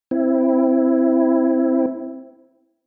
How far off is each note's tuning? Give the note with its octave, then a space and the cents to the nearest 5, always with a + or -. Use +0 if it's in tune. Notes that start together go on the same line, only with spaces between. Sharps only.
C4 +0 E4 +0